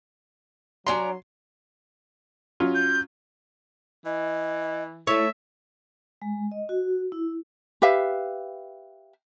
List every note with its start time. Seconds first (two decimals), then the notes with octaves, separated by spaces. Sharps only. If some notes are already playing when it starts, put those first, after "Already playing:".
0.87 F#3 C#4 D4 A#5 C6
2.60 F#3 C#4 F4
2.75 G6
4.05 E3 D#5
5.07 A3 E4 C#5 E5
6.22 G#3
6.52 D#5
6.69 F#4
7.12 E4
7.82 G4 B4 E5 F5